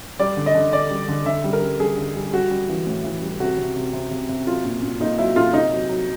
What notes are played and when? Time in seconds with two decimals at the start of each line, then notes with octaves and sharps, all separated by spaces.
0.19 G3 D5
0.37 D3
0.46 D#5
0.55 D3
0.72 D3 D5
0.91 G3
1.08 D3
1.26 D3 E5
1.44 G3
1.53 A#4
1.62 G3
1.80 G3 G#4
1.97 D3
2.15 G3
2.33 G3 F#4
2.51 G3
2.69 E3
2.87 A2
3.04 E3
3.22 G3
3.40 C3 F#4
3.58 C3
3.76 C3
3.93 C3
4.11 C3
4.29 C3
4.47 F#3 F4
4.65 A#2
4.83 A#2
5.00 A#2 D#4
5.18 F#3 E4
5.36 A#2 F4
5.53 C3 D#4
5.71 F#3
5.89 F#3